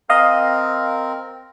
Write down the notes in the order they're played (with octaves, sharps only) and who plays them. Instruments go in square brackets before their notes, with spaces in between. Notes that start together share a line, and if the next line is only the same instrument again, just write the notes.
[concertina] C4 A#4 [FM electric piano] D#5 F5